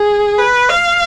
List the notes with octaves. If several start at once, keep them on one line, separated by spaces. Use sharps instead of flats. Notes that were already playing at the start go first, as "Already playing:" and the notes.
Already playing: G#4
B4
F5